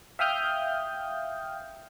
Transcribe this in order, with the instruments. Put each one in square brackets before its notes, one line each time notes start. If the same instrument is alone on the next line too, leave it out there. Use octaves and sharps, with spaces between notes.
[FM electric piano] E5 F5 G5 D#6 F6 G6